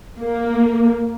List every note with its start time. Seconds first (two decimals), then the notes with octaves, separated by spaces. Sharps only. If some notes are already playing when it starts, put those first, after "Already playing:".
0.19 A#3